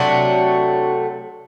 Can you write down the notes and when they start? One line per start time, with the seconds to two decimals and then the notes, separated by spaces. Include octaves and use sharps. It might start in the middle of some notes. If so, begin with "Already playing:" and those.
Already playing: C3 F#3 A3 D4 F#4